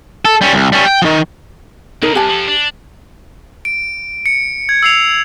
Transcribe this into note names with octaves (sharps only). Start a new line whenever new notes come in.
A4
G3 C#4
C2
G3 C#4
G5
D#3 F3
C#2 B2 D#4 A#4
C2 G4 G#5 A5
F3 A4
D4
D7
C#7
G#6
E6 C7 F7